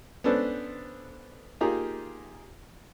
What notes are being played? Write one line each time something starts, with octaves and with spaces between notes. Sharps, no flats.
B3 C#4 D4 A4 B4 C5
A#3 D#4 F4 G4 G#4 A#5